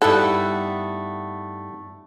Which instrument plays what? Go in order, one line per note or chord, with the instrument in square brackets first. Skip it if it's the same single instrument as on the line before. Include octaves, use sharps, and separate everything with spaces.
[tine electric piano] G2 D#4 [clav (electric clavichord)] G3 E4 [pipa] A3 B3 F#5 [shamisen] A4